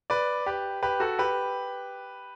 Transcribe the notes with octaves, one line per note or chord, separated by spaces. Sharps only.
B4 D5
G4 B4
G4 B4
F#4 A4
G4 B4